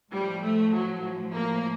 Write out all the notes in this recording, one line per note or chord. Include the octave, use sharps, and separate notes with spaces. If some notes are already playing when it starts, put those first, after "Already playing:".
A2 F3 G3
A3
F#3
A#3